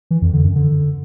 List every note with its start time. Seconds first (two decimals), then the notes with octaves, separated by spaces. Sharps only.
0.11 E3
0.22 F2
0.33 D3
0.44 F#2
0.56 D3